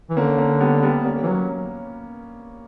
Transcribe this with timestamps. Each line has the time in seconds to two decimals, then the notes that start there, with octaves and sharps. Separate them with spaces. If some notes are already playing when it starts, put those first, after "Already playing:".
0.10 E3
0.17 D3 A#3 C#4
0.38 A#3 C#4
0.60 G3 B3
0.83 G3 B3
1.04 A#3 C#4
1.23 E3
1.27 F#3 A#3 C#4